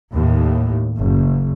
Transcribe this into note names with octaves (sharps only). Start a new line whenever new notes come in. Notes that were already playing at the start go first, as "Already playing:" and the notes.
D#2 A2
F#1